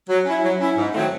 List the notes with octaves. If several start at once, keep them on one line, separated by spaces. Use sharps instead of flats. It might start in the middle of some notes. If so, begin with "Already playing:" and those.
F#3
C#4 E4
F#3
C#4 E4
G#2
D#3 F#3 A3 C4